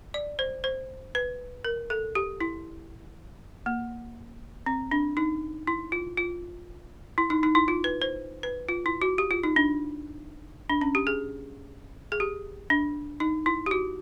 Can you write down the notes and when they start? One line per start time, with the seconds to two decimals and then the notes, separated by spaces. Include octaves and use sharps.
0.14 D5
0.39 C5
0.64 C5
1.15 B4
1.65 A#4
1.90 A4
2.15 G4
2.40 E4
3.66 A#3
4.66 C4
4.91 D4
5.17 D#4
5.67 E4
5.92 F4
6.18 F4
7.18 E4
7.30 D#4
7.43 D#4
7.55 E4
7.68 F4
7.84 B4
8.02 C5
8.43 B4
8.69 F4
8.86 E4
9.02 F#4
9.18 G4
9.31 F4
9.43 D#4
9.56 D4
10.70 D4
10.81 C#4
10.95 G4
11.07 G#4
12.12 G#4
12.20 G4
12.70 D4
13.20 D#4
13.46 E4
13.66 G4
13.71 F#4